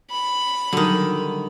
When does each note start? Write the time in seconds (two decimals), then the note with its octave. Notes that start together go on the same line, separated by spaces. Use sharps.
0.11 B5
0.73 D3 D#3 F#3 G3